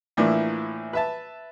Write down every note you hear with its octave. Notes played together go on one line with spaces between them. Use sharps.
A2 E3 F3 A#3 D4 E4
B4 E5 A5